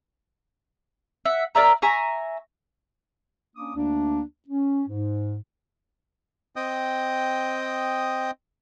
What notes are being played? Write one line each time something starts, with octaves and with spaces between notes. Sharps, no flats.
E5 F#5
A#4 D5 E5 A#5
E5 G#5 A#5 C#6
A#3 C#4 D4 D6 D#6
D2 D3 A3 A#3 D4
C#4
G#2
C4 D#5 G5 D#6